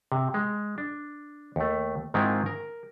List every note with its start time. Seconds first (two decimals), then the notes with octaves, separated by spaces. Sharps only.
0.12 C3
0.34 G#3
0.78 D4
1.56 D#2 A3
2.14 G#2 D#3 G#3 C4 E4 F4
2.46 A#4